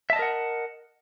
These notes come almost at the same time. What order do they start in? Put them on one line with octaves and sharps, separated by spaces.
E5 A5 D#5 A#4 F#5